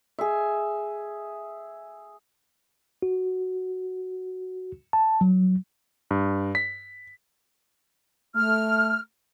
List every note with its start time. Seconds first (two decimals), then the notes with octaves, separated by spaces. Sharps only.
0.19 G#4 E5
3.02 F#4
4.93 A5
5.21 F#3
6.11 G2
6.55 B6
8.36 A3 F6